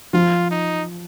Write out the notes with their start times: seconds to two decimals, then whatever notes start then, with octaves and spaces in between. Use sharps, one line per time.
0.13 F3 F4
0.51 D#4